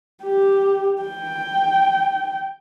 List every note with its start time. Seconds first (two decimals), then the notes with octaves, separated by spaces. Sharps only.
0.23 G4
1.02 G5